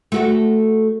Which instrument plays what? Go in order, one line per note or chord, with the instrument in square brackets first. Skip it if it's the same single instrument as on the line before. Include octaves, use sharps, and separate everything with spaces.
[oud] A3 F#4 A4